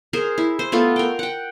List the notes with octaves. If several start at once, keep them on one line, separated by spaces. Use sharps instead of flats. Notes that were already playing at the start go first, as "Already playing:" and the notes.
G#4 A#4 C5
E4
C5
A3 B3 F4 A4
A#4 G5
F#5 G5